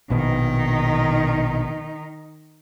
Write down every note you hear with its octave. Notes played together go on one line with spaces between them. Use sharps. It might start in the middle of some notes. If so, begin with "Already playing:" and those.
A#1 B2 D#3 D#4